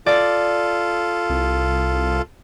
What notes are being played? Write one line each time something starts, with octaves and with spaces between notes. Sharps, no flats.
F4 A4 D5
C2